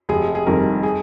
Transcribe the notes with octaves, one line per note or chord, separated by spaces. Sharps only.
F1 G#4
G#4
F2 D#3 G3 A#4
G#4